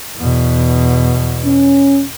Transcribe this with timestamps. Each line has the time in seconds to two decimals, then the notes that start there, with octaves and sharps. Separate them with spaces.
0.17 E2 B2
1.45 C#4